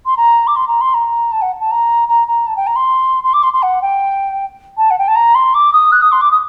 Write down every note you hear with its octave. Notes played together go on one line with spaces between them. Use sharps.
C6
A#5
D6
C6
A#5
C6
A#5
A5
F#5
A5
A#5
A#5
A#5
A5
G5
A#5
C6
C6
D6
C6
C6
F#5
G5
A5
F#5
G5
A5
A#5
C6
D6
D#6
F#6
D#6
C6
D6
D#6